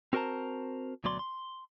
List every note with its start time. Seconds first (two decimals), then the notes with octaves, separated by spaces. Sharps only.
0.13 C4 F#4 A#4 C5 A5 A#5
1.04 D2 B2 F#3 D5 C6
1.19 C6